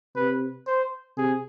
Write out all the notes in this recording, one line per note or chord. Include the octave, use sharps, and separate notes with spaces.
C3 B4
C5
C3 G#4